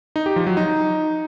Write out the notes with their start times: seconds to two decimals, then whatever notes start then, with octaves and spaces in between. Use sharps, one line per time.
0.16 D#4
0.26 G4
0.36 F3
0.47 F#3
0.57 D#4